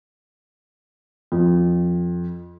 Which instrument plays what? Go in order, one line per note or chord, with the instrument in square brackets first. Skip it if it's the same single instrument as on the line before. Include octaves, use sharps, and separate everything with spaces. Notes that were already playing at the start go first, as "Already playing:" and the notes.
[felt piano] F2